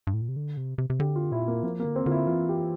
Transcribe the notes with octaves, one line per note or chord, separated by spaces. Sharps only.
G2
A2
A#2
C3
D3
C3
C3
C3
D3 G4
F4
A#2 E4
A#3
F3 A#3
A#3
D3
C4
D3 F4
E4
E3 F4
G4